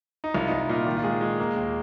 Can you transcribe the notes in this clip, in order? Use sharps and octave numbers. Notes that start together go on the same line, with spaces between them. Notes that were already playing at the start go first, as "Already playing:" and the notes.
D#4
C2 F4
C2 D#4
D#4
A#2 F4
D#3 F4
F4
G#3 G#4
G#3
A#3
D#2